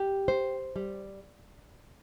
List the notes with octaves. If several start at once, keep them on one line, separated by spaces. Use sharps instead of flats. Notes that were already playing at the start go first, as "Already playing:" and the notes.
Already playing: G4
C5
G3